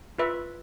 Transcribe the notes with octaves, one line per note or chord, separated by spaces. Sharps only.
F4 B4 E5